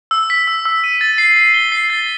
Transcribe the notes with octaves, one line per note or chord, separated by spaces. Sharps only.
E6
B6
E6
E6
D#7
A6
C7
C7
G7
C7
A6